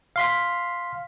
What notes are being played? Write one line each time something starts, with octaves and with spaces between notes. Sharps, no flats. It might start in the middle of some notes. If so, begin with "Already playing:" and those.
F5 C6 B6